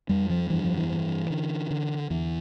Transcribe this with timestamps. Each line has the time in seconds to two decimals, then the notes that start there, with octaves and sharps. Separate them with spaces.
0.09 F2 G3
0.30 F3
0.50 G2 E3
0.64 F3
0.77 E3
0.90 G2
1.30 D3
1.70 D3
2.10 E2 E3